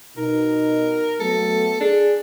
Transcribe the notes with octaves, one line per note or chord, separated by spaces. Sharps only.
B2 D#4 A#4
F#3 A3 B3 A4
D4 G#4